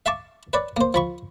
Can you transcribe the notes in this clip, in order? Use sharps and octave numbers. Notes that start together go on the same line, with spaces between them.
E5 F5 A5 C#6 D6
B4 C#5 D5
A#3 C5
F3 B5 C#6